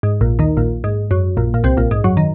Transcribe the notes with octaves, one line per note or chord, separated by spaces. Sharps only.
G#2
A#1 A#2
D#2 D#3
A#1 A#2
G#2
F#2
A#1 A#2
A#2
C2 C3
A#1 A#2
G#2
F#2 F#3
D#3